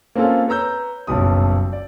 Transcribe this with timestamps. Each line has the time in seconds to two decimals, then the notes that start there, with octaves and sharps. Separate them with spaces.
0.15 A#3 C4 C#4 F4 A4
0.48 B4 C#5 A#5 E6 G6
1.07 F#1 B1 G2 D#6
1.73 D5